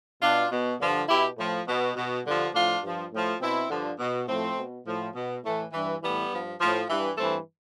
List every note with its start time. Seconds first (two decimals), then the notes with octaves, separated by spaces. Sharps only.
0.22 B2 D4 F4
0.51 B2
0.80 G2 D3 F3
1.09 B2 E4 G4
1.38 A2 F3
1.67 B2
1.96 B2
2.25 G2 D3 F3
2.54 A2 F3 D4 F4
2.83 G2 F3
3.12 A2 F3
3.41 B2 C4 E4
3.70 G2 D3 F3
3.99 B2
4.28 A2 F3 A3 C4
4.57 B2
4.86 A2 F3
5.15 B2
5.44 A2 E3 A3
5.72 G2 E3
6.02 A2 E3 G3 B3
6.32 G2 F3
6.60 A2 F3
6.88 G2 E3
7.17 G2 E3 A3 C4